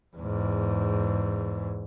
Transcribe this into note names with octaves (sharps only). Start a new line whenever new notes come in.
E2 G#2